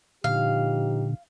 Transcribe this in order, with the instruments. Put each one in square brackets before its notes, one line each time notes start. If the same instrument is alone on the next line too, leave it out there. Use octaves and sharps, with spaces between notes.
[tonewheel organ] A#2 D3 [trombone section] F3 D#4 G4 [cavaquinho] F5